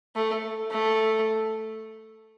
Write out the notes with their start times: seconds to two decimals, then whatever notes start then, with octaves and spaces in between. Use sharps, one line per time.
0.16 A3
0.71 A3